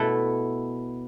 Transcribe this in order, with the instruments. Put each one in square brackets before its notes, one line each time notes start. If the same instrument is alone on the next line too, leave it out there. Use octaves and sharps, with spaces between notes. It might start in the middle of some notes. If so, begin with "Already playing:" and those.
Already playing: [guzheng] B2 A3 E4 A4